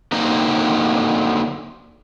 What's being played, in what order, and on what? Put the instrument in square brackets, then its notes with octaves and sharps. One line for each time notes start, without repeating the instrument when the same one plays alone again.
[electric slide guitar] D3 F#3 A#3 C4 D#4 A#5